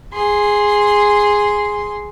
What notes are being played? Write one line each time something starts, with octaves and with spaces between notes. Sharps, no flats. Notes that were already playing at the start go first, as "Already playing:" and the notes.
G#4 C6